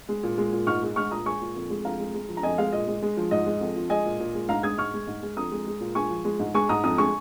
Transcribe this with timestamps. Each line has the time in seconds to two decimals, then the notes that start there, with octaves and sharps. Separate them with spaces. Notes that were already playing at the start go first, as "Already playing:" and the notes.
0.09 G#3
0.23 A#2
0.38 G#3
0.52 A#2
0.67 G#2 C#6 F6
0.83 G#3
0.96 G#3 C#6 F6
1.11 A#2 A#5 D#6
1.25 G#3 G#5 C#6
1.41 A#2
1.56 F2
1.70 G#3
1.85 F2 F5 A#5
1.99 G#3
2.14 G#3
2.29 F3
2.37 A#5
2.43 F2 D#5 G#5
2.58 G#3 F5
2.72 A#2 D#5
2.87 G#3
3.02 G#3
3.17 F3
3.31 G#2 D#5
3.46 G#3
3.61 F2
3.76 F3
3.90 G#3 D#5 G#5
4.05 A#2
4.19 A#2
4.35 G#3
4.49 G#2 F5 A#5
4.63 G#3 D#6 G#6
4.78 G#2 C#6 F6
4.94 G#3
5.07 G#2
5.22 G#3
5.36 F2 A#5 D#6
5.51 G#3
5.67 G#3
5.80 A#2
5.95 G#3 G#5 C#6
6.10 F3
6.25 G#3
6.40 G#2
6.54 G#3 G#5 C#6
6.69 G#2 A#5 D#6
6.84 F2 A#5 D#6
6.98 G#3 G#5 C#6